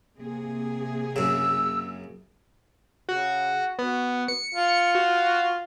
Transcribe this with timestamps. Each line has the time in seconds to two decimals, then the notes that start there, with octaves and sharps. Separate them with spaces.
0.20 C3 A#3 G#4
1.16 F#2 C#3 E6
3.09 C#3 F#4
3.79 B3 F#4
4.28 C#7
4.54 F4
4.95 F#4